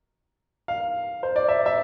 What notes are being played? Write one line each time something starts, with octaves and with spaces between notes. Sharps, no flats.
F5
C5
D5
E5
E5